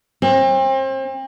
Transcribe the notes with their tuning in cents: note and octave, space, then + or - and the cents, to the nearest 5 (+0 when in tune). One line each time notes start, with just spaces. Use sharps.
C4 +35